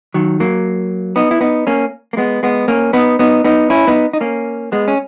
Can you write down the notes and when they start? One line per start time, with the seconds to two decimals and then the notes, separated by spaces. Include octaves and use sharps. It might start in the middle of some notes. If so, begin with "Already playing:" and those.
0.14 D#3 F#3
0.40 F#3 A#3
1.16 B3 D#4
1.31 E4
1.41 B3 D#4
1.67 A#3 C#4
2.13 A#3
2.17 G#3 B3
2.43 G#3 B3
2.68 A#3 C#4
2.93 B3 D#4
3.19 B3 D#4
3.45 B3 D#4
3.70 C#4 E4
3.87 B3 D#4
4.13 D#4
4.21 A#3 C#4
4.72 G#3 B3
4.88 C#4